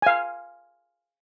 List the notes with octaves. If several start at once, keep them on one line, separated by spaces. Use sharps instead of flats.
F5 G#5